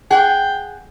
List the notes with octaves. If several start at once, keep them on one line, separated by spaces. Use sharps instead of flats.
G#4 F#5 G5